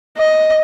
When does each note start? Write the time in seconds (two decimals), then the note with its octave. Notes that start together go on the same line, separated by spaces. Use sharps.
0.17 D#5